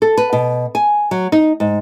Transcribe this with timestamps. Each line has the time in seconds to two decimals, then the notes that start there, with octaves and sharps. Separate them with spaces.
0.02 A4
0.17 B4
0.33 B2
0.75 G#5
1.11 F#3
1.32 D#4
1.60 G#2